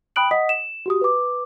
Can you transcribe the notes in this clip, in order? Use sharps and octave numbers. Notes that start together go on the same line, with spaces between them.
G5 B5 D#6 F#6 D7 F#7
D#5 F#5 D#6 B6
E7
F#4 G4 D#6
B4 D6